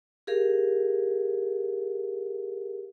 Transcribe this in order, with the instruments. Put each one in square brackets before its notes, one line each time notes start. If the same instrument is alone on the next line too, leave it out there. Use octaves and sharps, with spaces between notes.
[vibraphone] G4 G#4 A#4 F5